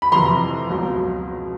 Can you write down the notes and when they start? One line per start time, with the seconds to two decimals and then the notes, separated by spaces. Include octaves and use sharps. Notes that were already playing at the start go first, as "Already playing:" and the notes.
0.02 B5
0.12 F2 C3 E3 A#5 C6
0.70 C#2 B2 F#3